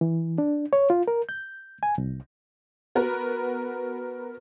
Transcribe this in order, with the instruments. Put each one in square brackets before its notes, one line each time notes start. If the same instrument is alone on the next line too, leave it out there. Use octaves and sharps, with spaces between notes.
[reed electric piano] E3
D4
C#5
F4
A#4
G6
G#5
C2
[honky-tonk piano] B3 F#4 A#4 B4